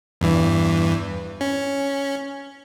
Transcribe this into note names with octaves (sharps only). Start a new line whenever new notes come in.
E2 G2 E3
C#4